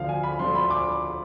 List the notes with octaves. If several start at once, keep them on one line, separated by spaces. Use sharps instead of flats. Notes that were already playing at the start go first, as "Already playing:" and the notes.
Already playing: D2 D3 F3 F5
G#5
B5
D2 D3 F3 C6
B5
D6